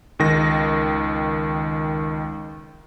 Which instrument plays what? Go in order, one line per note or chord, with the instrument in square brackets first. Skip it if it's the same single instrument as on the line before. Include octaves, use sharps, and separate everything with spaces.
[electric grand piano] C#2 D#3 A#6